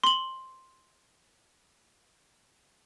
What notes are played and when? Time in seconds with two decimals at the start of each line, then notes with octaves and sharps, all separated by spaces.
0.04 C6 F#7